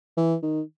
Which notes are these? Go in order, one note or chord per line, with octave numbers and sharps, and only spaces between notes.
E3
D#3